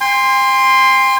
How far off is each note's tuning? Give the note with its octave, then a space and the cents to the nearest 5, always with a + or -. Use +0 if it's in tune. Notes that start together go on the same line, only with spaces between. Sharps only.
G5 +45 C6 +0